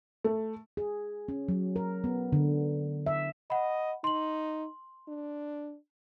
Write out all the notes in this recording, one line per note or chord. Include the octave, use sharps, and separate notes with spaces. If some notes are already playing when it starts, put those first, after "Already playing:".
A3
G#4
C#4
F#3
A#4
B3
D3
E5
D#5 F#5 B5
D#4 C6 F#7
D4